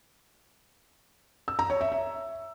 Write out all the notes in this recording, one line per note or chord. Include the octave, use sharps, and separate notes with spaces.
E6
A#5
C#5
E5
E5